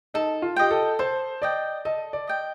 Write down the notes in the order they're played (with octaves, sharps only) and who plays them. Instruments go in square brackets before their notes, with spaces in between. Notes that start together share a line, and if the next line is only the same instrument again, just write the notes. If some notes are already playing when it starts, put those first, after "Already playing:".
[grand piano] D#4 [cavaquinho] A4
[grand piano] F4
[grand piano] G4 [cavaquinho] D#5 G5
[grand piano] A4
[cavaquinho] A4 [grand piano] C5
[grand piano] D5 [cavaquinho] D#5 G5
[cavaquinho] A4 [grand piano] D#5
[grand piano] D5
[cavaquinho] D#5 G5